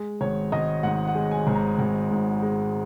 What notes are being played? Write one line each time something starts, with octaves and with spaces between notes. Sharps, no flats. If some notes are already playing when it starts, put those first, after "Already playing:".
Already playing: G#3
G#1 C#5
G#1 D#5
G#2 F#5
F#5
G#3
G#5
G#1
A#5
G#1
G#2
G#3